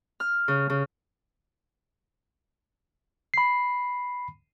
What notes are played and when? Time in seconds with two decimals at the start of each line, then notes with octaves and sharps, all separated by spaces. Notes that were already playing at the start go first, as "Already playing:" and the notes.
0.20 F6
0.48 C#3
0.70 C#3
3.34 B5 C7